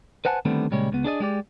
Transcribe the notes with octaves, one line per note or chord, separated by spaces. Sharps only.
B4 C5 F#5 G#5 A5
D3 D#3 G3 A3 B3 C4
A#2 C#3 G3 G#3 C#5
C#2 B3
D4 G#4 D5 D#5
G#3 G4 D5